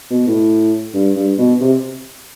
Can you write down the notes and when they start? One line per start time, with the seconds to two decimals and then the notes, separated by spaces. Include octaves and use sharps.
0.10 B2
0.27 A2
0.94 G2
1.16 G2
1.38 B2
1.61 C3